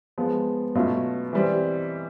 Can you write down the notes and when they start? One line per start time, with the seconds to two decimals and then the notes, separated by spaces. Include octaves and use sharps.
0.18 F3 G#3 B3
0.75 B2 F#3 A3 C#4 F4
1.33 E3 G3 C4